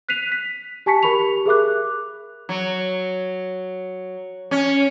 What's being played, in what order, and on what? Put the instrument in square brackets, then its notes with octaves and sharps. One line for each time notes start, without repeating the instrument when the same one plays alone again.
[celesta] F#6 B6 C7 D#7 F7
B6
G4 G#5 A5 C#6 B6 C#7
G4 A#4 B5 C#6 F7
G#4 A#4 E5 D6 F#6
[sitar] F#3
C#4